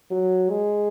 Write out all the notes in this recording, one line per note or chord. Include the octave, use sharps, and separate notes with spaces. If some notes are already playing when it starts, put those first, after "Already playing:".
F#3
G#3